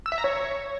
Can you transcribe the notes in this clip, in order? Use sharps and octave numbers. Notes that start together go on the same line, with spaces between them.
E6
E5
A#5
C#5